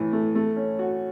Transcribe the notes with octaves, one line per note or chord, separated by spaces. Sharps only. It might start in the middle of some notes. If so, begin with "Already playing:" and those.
Already playing: A2 E3
A3
A3
C#4
F#4